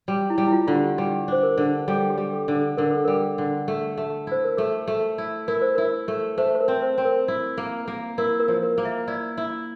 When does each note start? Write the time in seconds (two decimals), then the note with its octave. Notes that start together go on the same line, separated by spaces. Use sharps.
0.08 G3
0.30 E4
0.38 G3
0.48 E4
0.52 F4
0.67 D3 F4
0.75 G4
0.98 G3 G4
1.28 D4 C5
1.43 A#4
1.58 D3
1.88 G3 A4
2.10 G4
2.18 G3
2.33 A4
2.48 D3
2.55 A4
2.77 D3 A#4
2.91 A4
3.04 G3 A#4
3.38 D3
3.68 A3
3.97 A3
4.27 E4 C5
4.44 A#4
4.57 A3 A4
4.88 A3
5.18 E4
5.48 E4 A#4
5.62 C5
5.75 E4 A#4
6.08 A3
6.38 A3 C5
6.55 C5
6.61 A#4
6.68 C4
6.82 C5
6.98 C4
7.05 A#4
7.28 E4
7.58 A#3
7.88 A#3
8.18 E4 A#4
8.40 A#4
8.48 F3
8.63 A#4
8.78 A#3
8.85 E5
9.08 E4 D5
9.38 E4